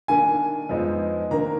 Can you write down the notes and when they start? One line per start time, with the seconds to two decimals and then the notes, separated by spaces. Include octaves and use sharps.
0.08 D#3 A#3 D4 G#5
0.69 F2 F3 G#3 B3 D#4
1.31 D#3 A#3 D4 A#5